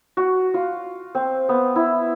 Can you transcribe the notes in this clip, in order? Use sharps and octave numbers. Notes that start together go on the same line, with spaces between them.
F#4
F4
C4
B3
E4